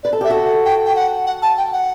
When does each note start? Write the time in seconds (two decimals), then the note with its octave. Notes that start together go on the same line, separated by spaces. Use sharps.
0.03 B4 D5
0.13 A4
0.21 G4 E5
0.30 F#4 A4
0.45 F#5
0.65 G5
0.86 G5
0.96 F#5
1.26 F#5
1.42 A5
1.58 G5
1.73 F#5